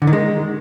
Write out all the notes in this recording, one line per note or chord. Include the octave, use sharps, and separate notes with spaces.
D3
D#3
G#3